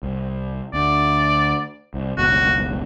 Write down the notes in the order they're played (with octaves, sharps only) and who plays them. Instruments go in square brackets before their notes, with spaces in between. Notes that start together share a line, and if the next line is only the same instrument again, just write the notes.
[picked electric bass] C2
[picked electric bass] D2 [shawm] D5
[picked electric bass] C2
[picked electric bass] F#1 C#2 B2 [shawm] F#4